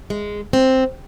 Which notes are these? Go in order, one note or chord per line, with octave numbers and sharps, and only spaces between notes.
G#3
C4